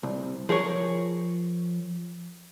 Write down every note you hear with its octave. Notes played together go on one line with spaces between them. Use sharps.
C2
F3 G#4 A#4 C#5